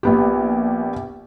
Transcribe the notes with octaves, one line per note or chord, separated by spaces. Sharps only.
A#1 B3 G4